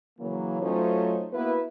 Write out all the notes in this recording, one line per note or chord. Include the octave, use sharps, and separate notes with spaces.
C#3 E3 F#3 A#3
F#3 A3 C#4 D#4 F4 C5
A#3 B3 E4 F#4 B4